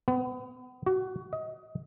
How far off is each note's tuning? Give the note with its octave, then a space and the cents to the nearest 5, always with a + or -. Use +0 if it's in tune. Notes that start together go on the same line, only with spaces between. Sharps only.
B3 +35
F#4 +20
D#5 +25